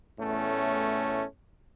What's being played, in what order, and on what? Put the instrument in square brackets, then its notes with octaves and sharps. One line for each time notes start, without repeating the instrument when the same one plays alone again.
[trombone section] E2 A2 A3 C#4